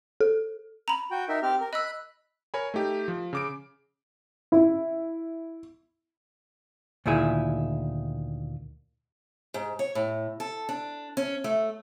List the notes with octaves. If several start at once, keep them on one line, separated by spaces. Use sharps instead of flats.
A4
A#5 B5
F#4 G5
D#4 A#4 E5
C4 G4 F6
A#4
D#5 B5 E6 F#6
A#4 C#5 G#5 B5
A3 D#4 G4
F3
C#3 D6 D7
E4
D2 A#2 D#3 E4 G#4
G#2
C#5
A2
A4
D4
C#4
A3